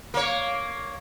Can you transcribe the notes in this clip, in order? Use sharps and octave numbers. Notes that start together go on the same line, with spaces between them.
A#3 C#5